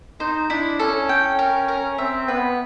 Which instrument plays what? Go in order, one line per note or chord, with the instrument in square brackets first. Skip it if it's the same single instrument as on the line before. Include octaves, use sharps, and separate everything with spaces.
[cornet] D#4 [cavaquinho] C5
[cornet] D4 [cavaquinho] E4
[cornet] C#4 [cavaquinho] A4
[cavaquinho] G5
A#4
A#4
[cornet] C4 [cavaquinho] E5
[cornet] B3 [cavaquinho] B4